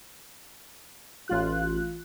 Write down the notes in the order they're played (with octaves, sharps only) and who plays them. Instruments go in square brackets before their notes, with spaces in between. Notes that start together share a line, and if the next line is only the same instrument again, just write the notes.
[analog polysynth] A1 F4 F#6